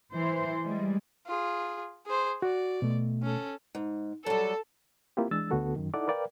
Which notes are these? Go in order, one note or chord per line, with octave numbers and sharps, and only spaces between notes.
E3 C5
G3 G#3
F4 G#4
G#4 C5
F#4 D5
B2 A3
C#4 A4
G#2
F#3 G3 A4
A#3 C4 E4 F4 G4
E3 G#3 D4 E6 A6
D2 D3 B3 F#4 A4
F#2 D#3
D#4 E4 A4 D5 F#5 D6
A#4 B4 D5 F5 G5